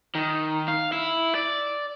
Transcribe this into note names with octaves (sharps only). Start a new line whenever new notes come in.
D#3
F5
E4
D5